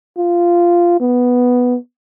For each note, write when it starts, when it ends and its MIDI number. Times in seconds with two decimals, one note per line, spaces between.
0.18 0.98 65
1.00 1.76 59